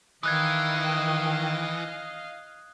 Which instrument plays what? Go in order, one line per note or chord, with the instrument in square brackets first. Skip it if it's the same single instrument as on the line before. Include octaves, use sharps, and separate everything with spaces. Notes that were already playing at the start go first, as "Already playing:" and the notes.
[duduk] D#3 [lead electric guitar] E3 [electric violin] D#5 F5 [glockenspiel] D#6 F#6 G#6